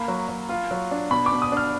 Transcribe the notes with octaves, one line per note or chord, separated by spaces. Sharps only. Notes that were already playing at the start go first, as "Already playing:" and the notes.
Already playing: A#3 B5
F#3
F#3
F4
F#3
D4
B2 B5
D6
B2
D#6
D4 F6